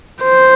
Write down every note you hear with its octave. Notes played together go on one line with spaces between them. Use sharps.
C5